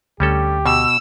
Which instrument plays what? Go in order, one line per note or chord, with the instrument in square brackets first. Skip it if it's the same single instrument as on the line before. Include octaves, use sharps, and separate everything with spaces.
[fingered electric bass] D2 [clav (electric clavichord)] G3 C#4 A4 [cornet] G4
[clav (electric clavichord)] B2 [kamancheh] E6